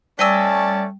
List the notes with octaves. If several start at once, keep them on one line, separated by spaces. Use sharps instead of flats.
G3 A3 C#4 D5 D#5 G#5 A5 E6